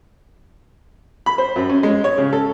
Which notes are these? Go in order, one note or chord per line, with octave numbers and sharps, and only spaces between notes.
B5
C5
F#2
C#4
G#3
C#5
C#3
A4